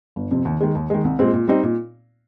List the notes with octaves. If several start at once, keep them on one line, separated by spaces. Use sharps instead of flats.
G1
F2 C3
D#2
D#3 G#3
D#2
D#3 G#3
C2
A#2 G#3 C4
A#2
G3 C4 D#4
A#2